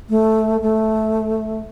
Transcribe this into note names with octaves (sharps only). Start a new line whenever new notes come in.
A3
A3